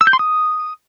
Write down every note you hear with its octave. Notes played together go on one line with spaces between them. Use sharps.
E6
G6
C6
D#6